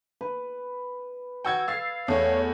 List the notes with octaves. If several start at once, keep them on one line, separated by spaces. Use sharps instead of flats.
B4
F#4 G5 E6 G#6
F5 E6 A6 C7
E2 A3 C#5